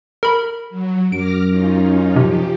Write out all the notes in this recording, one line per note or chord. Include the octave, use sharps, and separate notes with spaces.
A#4 B5
F#3
F#2 D6 F6 A#6 D7
C#4 D#4 F4
C3 F3 G4